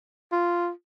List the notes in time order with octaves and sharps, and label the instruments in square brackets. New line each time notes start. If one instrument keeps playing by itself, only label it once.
[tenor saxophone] F4